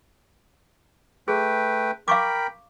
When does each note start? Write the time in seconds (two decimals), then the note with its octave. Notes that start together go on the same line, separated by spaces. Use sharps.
1.28 A3 G#4 B4 G5
2.08 A#4 F5 G5 B5 C#6 D6